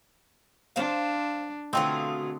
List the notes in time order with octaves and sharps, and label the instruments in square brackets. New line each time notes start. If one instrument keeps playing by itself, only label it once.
[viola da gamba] D4 [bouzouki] C5 F5
[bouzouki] B2 F4 G#4 [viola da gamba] D3 [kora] A3 C4 D#5